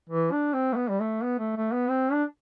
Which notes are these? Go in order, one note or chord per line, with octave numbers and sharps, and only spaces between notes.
E3
D4
C4
A3
B3
G3
A3
B3
A3
A3
B3
C4
D4